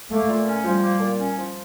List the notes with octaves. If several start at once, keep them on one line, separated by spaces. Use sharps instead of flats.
A3 A#3
A#2
C#4
F3 G3
A#3
A#2
C#4
F3